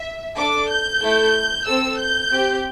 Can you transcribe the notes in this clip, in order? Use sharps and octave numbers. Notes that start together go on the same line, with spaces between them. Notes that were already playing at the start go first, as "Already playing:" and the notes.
Already playing: E5
D4 A4 D6
G6
A3 E4 A4
C4 A4 E6
G6
C4 G4